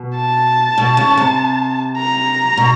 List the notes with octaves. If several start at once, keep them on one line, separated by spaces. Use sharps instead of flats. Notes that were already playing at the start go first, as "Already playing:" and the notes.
Already playing: B2
A5
B2
C#3
C3
A#5
B2